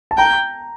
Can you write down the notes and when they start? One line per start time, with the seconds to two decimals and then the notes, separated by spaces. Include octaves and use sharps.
0.11 A5
0.17 G5 A#5